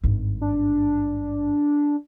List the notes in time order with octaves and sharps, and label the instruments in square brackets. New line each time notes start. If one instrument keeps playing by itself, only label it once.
[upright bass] G#1 G2
[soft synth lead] D4